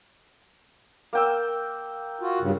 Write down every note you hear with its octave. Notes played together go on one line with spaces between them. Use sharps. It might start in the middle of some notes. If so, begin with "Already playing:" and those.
A#3 G5 E6
F4 F#4
G2 C#3